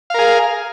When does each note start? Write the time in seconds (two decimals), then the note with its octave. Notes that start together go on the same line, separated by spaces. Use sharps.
0.10 F5
0.14 A#4
0.19 G#4